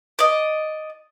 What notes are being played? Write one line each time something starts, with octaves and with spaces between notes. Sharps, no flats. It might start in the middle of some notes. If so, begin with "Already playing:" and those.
D5 D#5